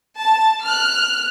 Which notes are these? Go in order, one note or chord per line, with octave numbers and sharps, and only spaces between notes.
A5
F6 F#6